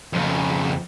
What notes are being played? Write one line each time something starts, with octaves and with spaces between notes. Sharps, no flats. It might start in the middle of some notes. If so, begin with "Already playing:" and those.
F2 C#3